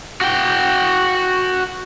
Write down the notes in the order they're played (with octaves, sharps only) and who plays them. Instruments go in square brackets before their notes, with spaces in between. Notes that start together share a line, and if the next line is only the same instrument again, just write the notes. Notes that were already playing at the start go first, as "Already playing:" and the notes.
[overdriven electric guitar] F#4 G5